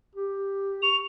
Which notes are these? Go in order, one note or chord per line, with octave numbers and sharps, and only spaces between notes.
G4
C#6 F7